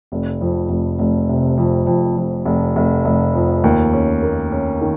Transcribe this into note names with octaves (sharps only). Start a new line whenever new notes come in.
F1
F2
F1
F1
C3
F2
F2
F2
F1
F1
F1
F2
D#2
C#4
A#3
C#4
D#3